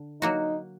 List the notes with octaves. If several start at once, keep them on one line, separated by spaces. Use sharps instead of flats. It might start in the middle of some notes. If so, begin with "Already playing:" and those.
Already playing: D3
F#3 A#3 D#4 F#4